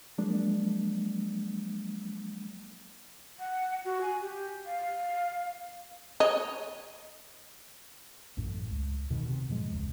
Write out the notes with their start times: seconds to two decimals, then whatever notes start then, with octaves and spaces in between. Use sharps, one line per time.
0.18 F3 F#3 G#3 A#3 D4
3.40 F#5
3.85 F#4
4.01 G#5
4.21 G4
4.66 F5
6.20 C#5 D#5
8.37 A1 F#2 A2
8.71 C#2
9.10 E1 B2 D#3
9.28 C3
9.49 G2 A#2 F3 G#3
9.72 E1 C#2